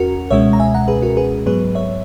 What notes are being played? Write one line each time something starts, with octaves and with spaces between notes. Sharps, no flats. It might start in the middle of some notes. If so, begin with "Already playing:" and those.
Already playing: E2 C#4 F#4 A#4
C#2 B2 G#3 C#4 C#5 E5
A#5
E5 G#5
F#5 A#5
G#4 B4
F#4 A#4
G#4 B4
G#2 F#3 B3 G#4 B4
C#5 E5